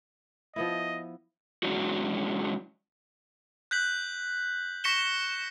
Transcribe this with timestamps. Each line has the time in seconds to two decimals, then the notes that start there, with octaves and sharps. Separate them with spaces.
0.56 F3 B3 E4 D#5
1.63 F#3 G#3 C#4 D4 E4 F#4
3.71 F#6 G6 B6 F#7
4.84 C#6 A#6 B6 C#7 E7 G7